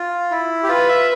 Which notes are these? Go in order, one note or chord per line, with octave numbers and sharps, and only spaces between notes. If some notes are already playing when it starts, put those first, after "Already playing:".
Already playing: F4
E4
G4
F4 B4
E5